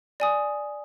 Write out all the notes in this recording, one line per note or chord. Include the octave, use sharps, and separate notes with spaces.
D5 G#5 D#6